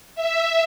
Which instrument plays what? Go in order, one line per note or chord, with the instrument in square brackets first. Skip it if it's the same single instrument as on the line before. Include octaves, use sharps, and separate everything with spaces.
[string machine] E5